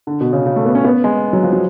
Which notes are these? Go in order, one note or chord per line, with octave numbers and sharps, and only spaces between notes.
D3
B2
C#3
C#3
A3
B3
C#4
B3
G#3
F#3
F3
F#3